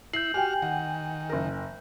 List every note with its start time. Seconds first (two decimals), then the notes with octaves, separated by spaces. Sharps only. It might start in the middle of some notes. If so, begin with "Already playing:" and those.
0.13 E4 G6 C7 F#7
0.34 F#4 G4 G5 G#5 F6
0.62 D#3 F#5
1.29 F#1 A#4